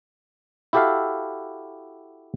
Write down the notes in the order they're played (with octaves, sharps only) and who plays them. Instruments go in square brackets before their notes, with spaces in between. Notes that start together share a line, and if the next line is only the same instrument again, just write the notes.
[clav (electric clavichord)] E4 F#4 G4 A4 E5 F5